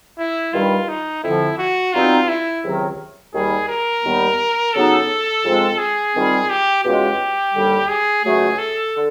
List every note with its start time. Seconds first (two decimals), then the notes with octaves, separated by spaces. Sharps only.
0.18 E4
0.54 G2 D#3 G3 F4
0.89 D#4
1.24 F2 D3 F3 E4
1.58 F#4
1.94 B2 G3 C4 D#4 F4
2.29 E4
2.64 C#2 C3 D#3 F#3
3.34 D#2 D#3 G3 G#4
3.69 A#4
4.04 D#2 D#3 G3 B3 D#4
4.74 C#3 F#3 B3 D#4 A4
5.44 G#2 F3 G#3 C4 F4
5.79 G#4
6.14 G#2 D#3 G3 C4 F4
6.50 G4
6.84 E2 B2 G#3 C#4 F4 G4
7.54 D#2 D3 G3
7.90 G#4
8.24 C#2 C#3 F#3 A3 G#4
8.59 A4
8.95 D3